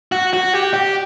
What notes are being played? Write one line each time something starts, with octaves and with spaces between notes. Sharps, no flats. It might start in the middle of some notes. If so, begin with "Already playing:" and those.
F#4
F#4
G4
G4